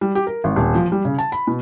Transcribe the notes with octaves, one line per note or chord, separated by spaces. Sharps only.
G3
G4
A#4
G#1
D#1
F3
G3
C#3
A5
B5
B2